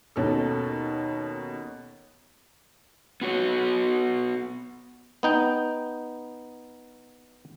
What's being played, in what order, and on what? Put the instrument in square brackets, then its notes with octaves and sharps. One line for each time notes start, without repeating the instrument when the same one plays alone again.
[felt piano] D#2 B2 C#4 A4
[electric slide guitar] B3 F#4 C#5
[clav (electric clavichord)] B3 D#4 G5